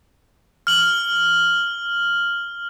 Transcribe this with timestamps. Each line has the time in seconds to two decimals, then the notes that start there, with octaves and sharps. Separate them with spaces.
0.67 F6 F#7